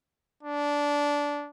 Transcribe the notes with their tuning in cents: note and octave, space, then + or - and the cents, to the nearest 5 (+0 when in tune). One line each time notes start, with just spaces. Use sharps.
D4 -15